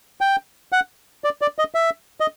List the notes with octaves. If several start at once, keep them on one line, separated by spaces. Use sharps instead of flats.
G5
F#5
D5
D5
D#5
E5
D#5